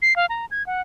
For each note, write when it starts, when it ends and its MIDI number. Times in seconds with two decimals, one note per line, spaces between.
0.02 0.16 96
0.16 0.26 77
0.29 0.46 82
0.51 0.65 92
0.66 0.82 78